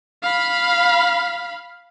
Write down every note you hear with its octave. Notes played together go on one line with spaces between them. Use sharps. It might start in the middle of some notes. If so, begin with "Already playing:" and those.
F5 B5